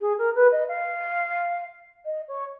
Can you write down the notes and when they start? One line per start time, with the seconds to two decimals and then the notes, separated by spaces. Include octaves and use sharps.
0.01 G#4
0.18 A#4
0.35 B4
0.51 D#5
0.68 F5
2.05 D#5
2.28 C#5